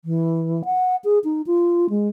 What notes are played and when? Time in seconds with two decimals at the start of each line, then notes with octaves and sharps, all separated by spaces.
0.05 E3
0.65 F#5
1.04 G#4
1.24 D#4
1.47 F4
1.90 G#3